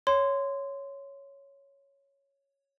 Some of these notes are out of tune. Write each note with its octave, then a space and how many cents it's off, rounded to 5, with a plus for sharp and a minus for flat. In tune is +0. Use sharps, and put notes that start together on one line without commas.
C#5 +0 C6 -15